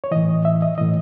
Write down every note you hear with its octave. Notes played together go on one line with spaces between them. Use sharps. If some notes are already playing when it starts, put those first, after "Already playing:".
C#5
A2 E3 D#5
E5
D#5
A2 E3 D#5